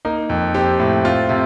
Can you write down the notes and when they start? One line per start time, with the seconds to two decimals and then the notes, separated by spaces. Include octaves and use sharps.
0.05 A#3 D#4
0.29 F2
0.54 C4 G4
0.80 A2
1.05 C4 F4
1.29 C3